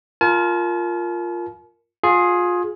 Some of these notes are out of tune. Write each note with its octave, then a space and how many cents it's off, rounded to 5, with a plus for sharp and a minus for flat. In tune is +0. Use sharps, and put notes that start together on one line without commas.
F4 +0 A#4 +0 A5 -45
F4 +25 G#4 +5